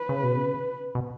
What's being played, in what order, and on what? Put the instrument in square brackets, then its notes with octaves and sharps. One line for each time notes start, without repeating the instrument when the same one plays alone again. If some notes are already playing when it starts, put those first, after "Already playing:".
Already playing: [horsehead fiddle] B4
[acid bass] C#3
B2
C#3
B2